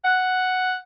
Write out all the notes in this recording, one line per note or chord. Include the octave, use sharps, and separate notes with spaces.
F#5